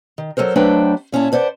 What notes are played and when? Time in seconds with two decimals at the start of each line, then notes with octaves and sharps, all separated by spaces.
0.18 D#3
0.37 F#3 G3 A4 A#4 C5
0.56 F#3 A3 D4 B4 C5 G5
1.12 A#2 C#4 E4 A5
1.32 B4 C5 D5 F#5